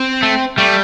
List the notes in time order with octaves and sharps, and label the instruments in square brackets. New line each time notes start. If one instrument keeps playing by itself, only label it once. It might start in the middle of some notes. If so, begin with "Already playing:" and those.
Already playing: [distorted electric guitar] C4
[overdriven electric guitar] A3
[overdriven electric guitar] G3 [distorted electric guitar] A3